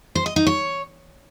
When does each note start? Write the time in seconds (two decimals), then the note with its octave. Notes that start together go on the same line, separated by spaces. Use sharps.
0.15 C5
0.26 D#5
0.36 D#4
0.47 C#5